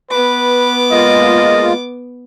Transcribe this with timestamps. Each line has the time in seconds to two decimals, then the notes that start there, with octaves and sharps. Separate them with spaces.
0.11 B3 B4 D6
0.91 G#3 A#3 F4 D#5